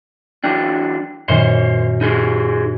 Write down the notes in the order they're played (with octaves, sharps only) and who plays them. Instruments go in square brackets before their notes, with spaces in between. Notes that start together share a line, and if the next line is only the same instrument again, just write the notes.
[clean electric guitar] E3 F#3 D4 [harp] G5 A#5 F#6
[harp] F#2 A#2 D#3 [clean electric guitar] C5 C#5 C6
[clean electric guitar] D#4 G4 G#4